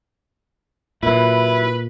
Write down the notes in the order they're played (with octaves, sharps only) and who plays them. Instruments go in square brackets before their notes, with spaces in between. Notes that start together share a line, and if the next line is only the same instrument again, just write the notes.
[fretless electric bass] A#2 [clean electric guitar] F#3 E4 [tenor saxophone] B4